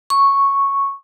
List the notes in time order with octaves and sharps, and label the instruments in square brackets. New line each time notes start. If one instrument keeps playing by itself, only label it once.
[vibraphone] C#6